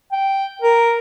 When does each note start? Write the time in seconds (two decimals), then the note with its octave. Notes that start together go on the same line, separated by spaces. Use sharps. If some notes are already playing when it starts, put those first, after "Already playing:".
0.12 G5
0.62 A#4